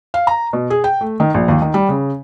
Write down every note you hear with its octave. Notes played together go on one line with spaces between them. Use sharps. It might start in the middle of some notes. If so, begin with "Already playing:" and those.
F5
A#5
B2
G#4
G5
A3
D#3
A#1
D#2
D#3
G3
C#3